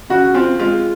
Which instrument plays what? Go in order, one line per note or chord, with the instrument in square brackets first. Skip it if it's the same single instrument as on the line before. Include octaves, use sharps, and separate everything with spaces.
[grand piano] C#3 F#4
C4 F4
G#3 F4